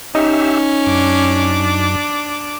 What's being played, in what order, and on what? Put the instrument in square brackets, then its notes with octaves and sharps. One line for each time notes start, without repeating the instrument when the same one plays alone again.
[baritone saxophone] C#4 [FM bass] D#4 [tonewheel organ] G4 E5
[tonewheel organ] F#2 [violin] D4 D6